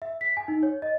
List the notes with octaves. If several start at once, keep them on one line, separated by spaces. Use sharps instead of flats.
E5
B6
G#5
D#4
C#5
D#5